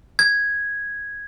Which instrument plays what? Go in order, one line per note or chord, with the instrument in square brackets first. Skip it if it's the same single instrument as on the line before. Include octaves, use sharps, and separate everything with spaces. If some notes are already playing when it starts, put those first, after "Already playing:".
[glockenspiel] G#6